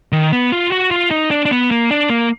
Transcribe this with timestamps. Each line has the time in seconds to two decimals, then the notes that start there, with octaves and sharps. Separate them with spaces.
0.12 D#3
0.32 B3
0.52 F4
0.72 F#4
0.91 F4
1.11 D#4
1.31 D4
1.45 D4
1.51 B3
1.71 A#3
1.91 D4
2.10 A#3